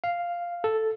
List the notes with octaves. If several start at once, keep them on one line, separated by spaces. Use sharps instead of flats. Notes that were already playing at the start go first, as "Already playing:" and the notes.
F5
A4